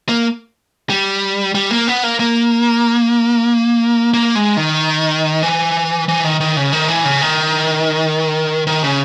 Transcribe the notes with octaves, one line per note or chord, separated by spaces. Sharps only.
A#3
G3
G3
A#3
B3
A#3
A#3
A#3
G#3
D#3
E3
E3
D#3
D#3
C#3
D#3
E3
C#3
D#3
D#3
C#3